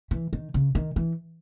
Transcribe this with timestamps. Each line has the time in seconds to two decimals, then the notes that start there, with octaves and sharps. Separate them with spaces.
0.11 E3
0.33 D#3
0.54 C#3
0.75 D#3
0.96 E3